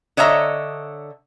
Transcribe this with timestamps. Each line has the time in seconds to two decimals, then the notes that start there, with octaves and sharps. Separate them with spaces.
0.17 D3 C#5 D#5 E5 A#5